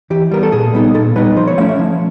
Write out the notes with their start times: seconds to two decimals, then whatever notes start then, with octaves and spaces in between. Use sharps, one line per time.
0.10 E3 G4
0.32 G3 B3 A#4
0.43 A4
0.52 A#2 G#4
0.74 G3 B3 D#4
0.94 A#2 A4
1.16 G3 B3 D#4 B4
1.36 F3 C5
1.47 C#5
1.58 A3 C#4 E4 F5
1.69 E5
1.79 F3